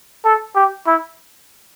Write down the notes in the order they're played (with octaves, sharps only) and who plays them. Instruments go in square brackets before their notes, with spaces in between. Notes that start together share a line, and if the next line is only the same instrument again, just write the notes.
[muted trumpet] A4
G4
E4